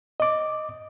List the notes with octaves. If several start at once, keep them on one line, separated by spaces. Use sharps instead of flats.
D#5 D6